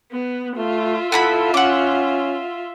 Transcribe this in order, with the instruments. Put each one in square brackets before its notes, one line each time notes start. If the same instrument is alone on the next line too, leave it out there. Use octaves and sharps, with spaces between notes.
[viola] B3
[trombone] A3 [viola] F4 E5
[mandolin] B3 E4 B5 [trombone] A4
[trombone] C#4 [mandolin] F#5 D6